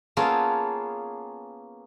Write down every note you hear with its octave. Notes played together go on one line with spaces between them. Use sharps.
A#3 B3 C#4 F4 G#4 A4